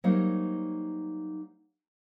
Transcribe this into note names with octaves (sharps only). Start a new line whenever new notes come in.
F#3 G3 A#3 D#4 C5 C#5